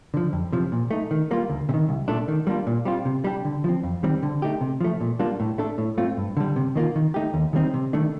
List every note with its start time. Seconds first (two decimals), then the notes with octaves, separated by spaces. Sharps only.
0.14 D3 F3
0.33 F2
0.53 C3 F3
0.72 A#2
0.91 A3 D#4
1.11 D#3
1.31 G3 A#3 F4
1.50 D2
1.69 C3
1.74 D#3
1.89 C2
2.08 A#2 A3 D4 A4
2.28 D#3
2.47 G3 A#3 D4 F4
2.67 A#2
2.85 G3 C4 F4
3.05 C3
3.24 G3 D4 G4
3.45 D3
3.64 F3 C4
3.83 F2
4.03 D#3 G3 C4
4.23 D3
4.42 A3 D#4 G4
4.61 C3
4.81 F3 A3
5.01 A#2
5.19 G3 A#3 D4 F4
5.40 A2
5.58 A3 D4 A4
5.78 A2
5.98 A3 C4 F4
6.17 G2
6.37 D3 G3
6.56 C3
6.75 D#3 A#3 F4
6.96 D#3
7.14 A3 D#4 G4
7.34 D#2
7.53 D#3 G3 C4 D#4
7.74 C3
7.93 D#3 A3 D4